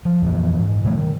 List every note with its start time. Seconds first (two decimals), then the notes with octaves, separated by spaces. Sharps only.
0.05 F3
0.22 F2 A#2 E3
0.59 G#2
0.84 B2 E3 G3 A3
0.97 D#3